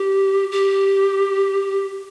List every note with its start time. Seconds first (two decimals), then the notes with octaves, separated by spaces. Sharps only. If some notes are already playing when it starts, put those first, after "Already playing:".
Already playing: G4
0.52 G4